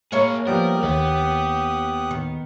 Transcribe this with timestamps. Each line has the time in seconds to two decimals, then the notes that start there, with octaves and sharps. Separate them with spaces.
0.12 A#3 E4 G#4 A#4 C#5
0.47 F3 G3 B3 G4 A#4 D#6 F#6
0.83 D#2 B3
2.11 D#3